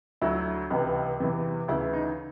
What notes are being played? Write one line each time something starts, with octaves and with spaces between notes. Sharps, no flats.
D2 D3 F#3 E4
C#2 C3 E3
E2 C3 E3
D2 C#3 E3 E4
D#4